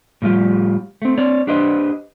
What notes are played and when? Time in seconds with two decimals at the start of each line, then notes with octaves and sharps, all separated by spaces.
0.22 A2 F3 G3 F4 G4
1.02 A3 C4
1.18 C4 C#5 D5
1.47 D4 G4 B4 C5 D#5